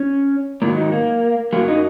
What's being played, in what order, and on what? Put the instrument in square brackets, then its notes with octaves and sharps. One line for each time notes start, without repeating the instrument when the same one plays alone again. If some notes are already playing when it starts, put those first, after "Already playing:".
Already playing: [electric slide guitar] C#4
G#2 D#3 F#3 A#3
D#4
A#3
F#2 F#3 A#3
D#4